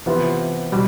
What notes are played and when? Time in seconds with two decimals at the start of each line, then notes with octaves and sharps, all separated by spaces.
0.06 C3 E3 B3 F4 B4
0.72 B2 G3